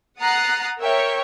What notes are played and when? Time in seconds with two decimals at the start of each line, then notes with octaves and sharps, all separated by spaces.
0.20 F#5 A#5 D#6 F#6 A6 C7
0.79 A#4 C#5 E5 G5 C#6